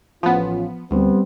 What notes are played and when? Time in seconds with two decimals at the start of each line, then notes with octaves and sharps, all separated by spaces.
0.23 A1 F3 B3 C#4 F4
0.91 D2 G3 B3 C4